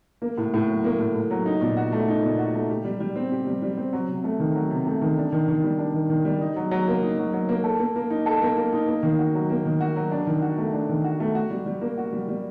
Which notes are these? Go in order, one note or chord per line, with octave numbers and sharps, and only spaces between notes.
A#3
A2
A2
F#3
A#3
A2
A2
F#3
D#4
A#2
F#4
A3
D#4
A#2
F#4
A3
G4
G3
G3
C4
G4
G3
G3
C4
F#3
C3
A3
D#3
F#3
C3
A3
D#3
D4
D#3
D#3
G3
D4
D#3
D#3
G3
D#4
F#3
F#3
A#3
D#4
F#3
F#3
A#3
A4
A#3
A#3
D#4
A4
A#3
A#3
D#4
A#3
D#3
F#4
F#3
A#3
D#3
F#4
F#3
D4
D#3
F#4
A3
D4
D#3
F#4
A3
F#4
G3
G3
A#3
F#4
G3
G3